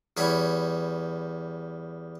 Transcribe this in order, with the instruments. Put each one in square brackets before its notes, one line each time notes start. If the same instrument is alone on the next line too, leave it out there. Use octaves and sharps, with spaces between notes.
[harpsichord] E2 G3 C#5 B5